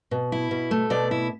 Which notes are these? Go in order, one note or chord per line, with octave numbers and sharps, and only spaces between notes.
B2
E4
B2
A3
B2 D5
E4